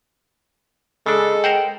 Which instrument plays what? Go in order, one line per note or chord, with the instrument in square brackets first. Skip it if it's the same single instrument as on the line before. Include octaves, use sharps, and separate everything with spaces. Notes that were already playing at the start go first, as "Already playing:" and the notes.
[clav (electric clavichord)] C#3 D4 [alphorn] G#3 [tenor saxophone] A4
[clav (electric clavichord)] A#4 C5 F#5 [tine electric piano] G5